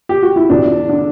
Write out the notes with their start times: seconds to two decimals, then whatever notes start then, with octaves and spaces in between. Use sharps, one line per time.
0.09 G4
0.23 F#4
0.36 E4
0.50 E2 D4
0.89 D3